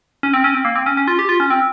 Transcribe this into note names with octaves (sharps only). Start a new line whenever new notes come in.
C#4
C4
C#4
C4
A#3
C4
C#4
C#4
F4
G4
F4
C#4
C4